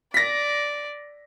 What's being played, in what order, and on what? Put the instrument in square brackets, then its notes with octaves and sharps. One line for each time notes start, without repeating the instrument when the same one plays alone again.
[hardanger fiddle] D5 [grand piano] A#6 B6